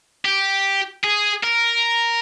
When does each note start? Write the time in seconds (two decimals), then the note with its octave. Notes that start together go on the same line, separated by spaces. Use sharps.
0.25 G4
1.03 G#4
1.43 A#4